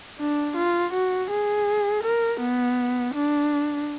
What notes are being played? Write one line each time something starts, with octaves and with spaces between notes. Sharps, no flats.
D4
F4
F#4
G#4
A#4
B3
D4